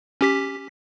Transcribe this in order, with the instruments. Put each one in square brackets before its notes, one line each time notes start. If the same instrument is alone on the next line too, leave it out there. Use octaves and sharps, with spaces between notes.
[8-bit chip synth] C#4 G4 B6